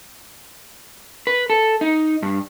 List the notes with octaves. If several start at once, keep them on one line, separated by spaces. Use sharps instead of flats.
B4
A4
D#4
G2